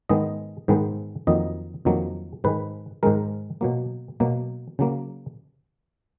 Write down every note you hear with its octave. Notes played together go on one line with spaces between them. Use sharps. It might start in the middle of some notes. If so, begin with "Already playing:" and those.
G#2 D#3 G#3 B3 D#5
G#2 D#3 G#3 B3
F2 D#3 F#3 A#3 D#5
F2 D#3 F#3 A#3
G#2 D#3 G#3 B4
G#2 D#3 G#3 A#4
B2 F#3 A#3
B2 F#3 A#3
C#3 F#3 A#3